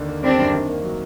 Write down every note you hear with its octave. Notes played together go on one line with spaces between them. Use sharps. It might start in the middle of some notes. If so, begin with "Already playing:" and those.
Already playing: D#2 D3
A#3
G3 C4 D4
F#2
D#3
A#3
F#3